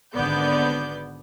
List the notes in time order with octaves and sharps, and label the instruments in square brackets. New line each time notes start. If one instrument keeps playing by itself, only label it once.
[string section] G#1 D3 B3 D5 G6